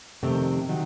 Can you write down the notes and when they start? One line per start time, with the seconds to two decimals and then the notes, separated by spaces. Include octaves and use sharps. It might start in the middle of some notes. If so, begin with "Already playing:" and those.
0.22 F2 C3 D#3 A3 C4
0.69 C3 D#3 F#3